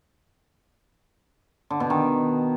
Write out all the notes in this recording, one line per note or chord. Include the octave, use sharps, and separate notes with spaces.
D3
B2
D#3